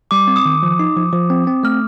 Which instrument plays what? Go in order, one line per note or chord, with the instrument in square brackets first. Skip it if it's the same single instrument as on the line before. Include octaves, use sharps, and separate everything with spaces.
[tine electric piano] G3 [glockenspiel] D6
[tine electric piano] C4
[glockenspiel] D#6
[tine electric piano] D#3
F3
D#4
F3
F3
C4
C4
[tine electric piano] A3 [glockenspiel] F6